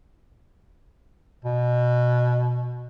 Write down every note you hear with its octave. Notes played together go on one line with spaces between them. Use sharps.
B2